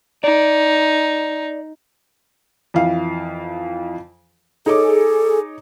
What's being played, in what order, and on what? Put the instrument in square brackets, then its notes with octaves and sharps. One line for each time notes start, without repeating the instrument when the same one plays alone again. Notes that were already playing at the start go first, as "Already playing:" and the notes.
[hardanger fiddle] D#4 [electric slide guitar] D5
[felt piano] F2 E3 F5
[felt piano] D#4 C#5 D6 [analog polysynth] G#4 [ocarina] A4